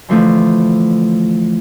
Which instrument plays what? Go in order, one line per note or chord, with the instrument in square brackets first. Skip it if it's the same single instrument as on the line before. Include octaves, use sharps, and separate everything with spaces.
[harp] D3 E3 F3 A3